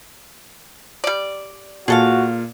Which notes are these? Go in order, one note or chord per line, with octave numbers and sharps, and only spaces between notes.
G3 D5
A#2 F#4 G#4 A4 F5